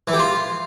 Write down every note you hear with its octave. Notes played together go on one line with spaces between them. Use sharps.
E3
G4
F4